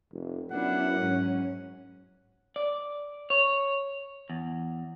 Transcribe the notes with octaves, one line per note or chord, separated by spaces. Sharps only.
F1
F#2 B3 D4 E4 F#5
G#2 F#3 C#4
D5
C#5
E2